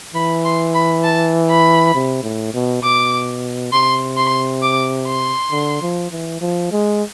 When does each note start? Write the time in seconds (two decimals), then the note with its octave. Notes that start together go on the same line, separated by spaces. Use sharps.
0.14 E3 B5
0.45 C6
0.74 B5
1.04 A5
1.49 B5
1.94 C3
2.23 A2
2.54 B2
2.83 B2 D6
3.72 C3 C6
4.17 C6
4.62 D6
5.07 C6
5.51 D3
5.82 F3
6.11 E3
6.41 F3
6.72 G#3